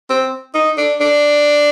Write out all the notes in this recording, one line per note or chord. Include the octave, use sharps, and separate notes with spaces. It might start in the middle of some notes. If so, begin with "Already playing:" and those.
C4
D#4
D4
D4